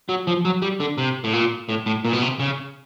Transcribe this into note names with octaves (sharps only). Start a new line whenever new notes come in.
F#3
F3
F#3
G3
D3
C3
A2
A#2
A2
A2
A#2
B2
C3
C#3